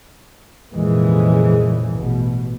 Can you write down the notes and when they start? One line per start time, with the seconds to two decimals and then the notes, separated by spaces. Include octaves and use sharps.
0.72 C2 F2 A#2 C#3 E3 G#3
1.92 A1 B2